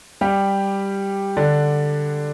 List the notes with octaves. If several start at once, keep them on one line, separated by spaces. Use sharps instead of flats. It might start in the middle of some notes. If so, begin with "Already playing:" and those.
G3 G4
D3 D4